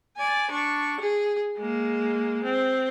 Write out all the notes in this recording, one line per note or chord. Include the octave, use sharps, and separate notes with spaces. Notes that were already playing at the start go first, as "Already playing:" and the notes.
D5 G#5
D4 C#6
G#4
G#3 A#3
C4